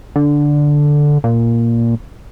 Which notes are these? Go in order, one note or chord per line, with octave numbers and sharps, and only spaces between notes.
D3
A#2